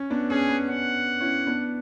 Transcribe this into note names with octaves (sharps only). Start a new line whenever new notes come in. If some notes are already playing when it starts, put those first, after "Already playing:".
Already playing: C#4
B3 D4
C#4 G#4
B3
C#4 F#5
C#4 E4
B3 D4